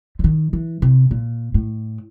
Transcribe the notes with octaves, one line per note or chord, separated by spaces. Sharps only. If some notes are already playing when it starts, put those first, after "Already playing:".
D3
D#3
E3
C3
A#2
A2